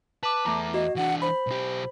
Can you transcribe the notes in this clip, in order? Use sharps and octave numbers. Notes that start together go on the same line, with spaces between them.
B4 A5 D6
E2 A3 B4 A#5
F#4 D#5
E3 D4 F#5
C5 B5
B1 G4